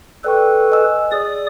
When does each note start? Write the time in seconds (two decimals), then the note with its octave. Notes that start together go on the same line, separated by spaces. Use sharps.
0.24 A4 B4 D5 G5 C#6
0.72 D#5 G#5 E6
1.12 G#4 D5 D#6